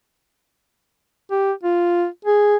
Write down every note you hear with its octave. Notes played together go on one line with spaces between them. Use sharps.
G4
F4
G#4